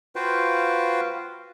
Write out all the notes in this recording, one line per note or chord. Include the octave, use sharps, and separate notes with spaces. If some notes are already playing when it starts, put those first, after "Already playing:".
F4 F#4 B4 C5 F5 G5